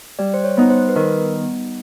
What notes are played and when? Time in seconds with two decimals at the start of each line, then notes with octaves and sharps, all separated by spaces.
0.19 G3 D5
0.34 C5
0.44 C#5
0.57 B3 D#4
0.70 C5
0.89 B4
0.96 D#3 A#4